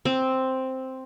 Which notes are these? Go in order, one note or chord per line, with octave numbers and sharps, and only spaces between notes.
C4